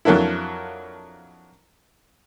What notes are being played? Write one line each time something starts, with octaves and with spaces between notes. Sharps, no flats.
F2 F#3 A#3 D4 E4